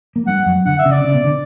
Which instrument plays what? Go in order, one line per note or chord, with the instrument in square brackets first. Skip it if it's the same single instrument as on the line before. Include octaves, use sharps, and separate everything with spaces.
[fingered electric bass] A#3
[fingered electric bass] G2 G3 [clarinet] F#5
[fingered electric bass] F#2 F#3
[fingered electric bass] D3 D4 [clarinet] F#5
[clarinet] E5
[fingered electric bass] C#3 C#4
[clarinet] D5
[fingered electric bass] C#3 C#4
B2 B3
D3 D4